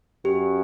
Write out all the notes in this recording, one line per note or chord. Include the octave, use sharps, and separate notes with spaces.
F#2 G4